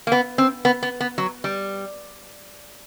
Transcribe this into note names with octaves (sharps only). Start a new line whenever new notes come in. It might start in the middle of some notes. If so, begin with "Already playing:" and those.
A#3
B3
C4
B3
B3
B3
F#3
G3